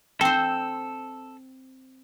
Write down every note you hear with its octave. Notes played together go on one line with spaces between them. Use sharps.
C4 A4 C5